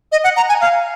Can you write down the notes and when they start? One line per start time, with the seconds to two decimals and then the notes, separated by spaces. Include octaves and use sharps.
0.12 D#5
0.24 F#5
0.37 A#5
0.49 G#5
0.61 F5